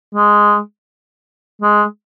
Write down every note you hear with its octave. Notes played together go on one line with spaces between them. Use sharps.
G#3
G#3